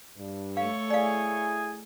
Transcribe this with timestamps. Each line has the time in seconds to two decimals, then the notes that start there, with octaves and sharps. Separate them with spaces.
0.18 G2
0.57 A3 A4 C#5 F5
0.90 E4 G#4 D5 F5 G#5